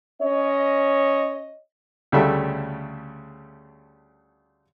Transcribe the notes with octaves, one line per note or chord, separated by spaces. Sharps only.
C#4 C#5 D#5
D2 C#3 G3 A3 A4 E5